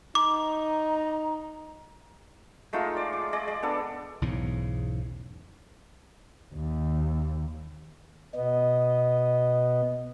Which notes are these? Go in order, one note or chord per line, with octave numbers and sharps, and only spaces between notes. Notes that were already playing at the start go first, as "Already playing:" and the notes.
D#4 A#5 D6
G#3 A3 D#4 F4
D5
D6
G#4 D5 D#5
G#3
B3 D4 A4
B1 E2 G#2 C#3
D#2
B2 B3 D#5